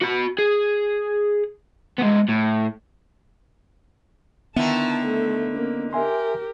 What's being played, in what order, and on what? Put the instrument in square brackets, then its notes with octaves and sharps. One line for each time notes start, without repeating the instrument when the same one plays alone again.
[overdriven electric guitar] F#4 B5
G#4
G#3 B3
A2
[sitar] D3 D#3 E4 [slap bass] B3 [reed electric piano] E5 [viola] A5
[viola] A3
[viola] A#3 [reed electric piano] C#4
[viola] G4 A#4 [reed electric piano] E5 G#5 C6